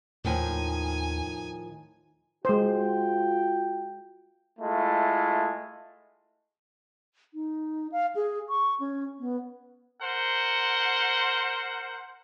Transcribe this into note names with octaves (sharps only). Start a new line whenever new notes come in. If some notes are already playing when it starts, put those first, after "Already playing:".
D#2 A2 D#3 F3 G#5
G#3 F4 F#4 C5 G5
G#3 A3 E4 F4
D#4
F5
G#4
C#6
C#4
B3
A#4 C5 F#5